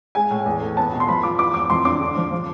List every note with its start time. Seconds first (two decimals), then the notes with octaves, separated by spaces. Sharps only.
0.15 G#3 G#5
0.30 A2
0.46 E2
0.61 A3
0.77 B3 A5
0.92 B2
1.00 C6
1.08 F3 B5
1.23 F4 D6
1.39 E2 D6
1.54 E2 D6
1.70 F2 C6
1.85 D4 D6
2.00 D3
2.16 F3
2.31 F3